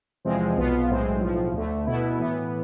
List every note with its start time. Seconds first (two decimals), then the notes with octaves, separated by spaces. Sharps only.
0.25 E2 C3 F3 G#3 C4
0.58 B1 B2 B3 F4
0.90 B1 A2 G#3 C4
1.21 B1 A2 F3
1.53 D2 D3 A3
1.86 B2 B3 E4
2.18 A2 E3 B3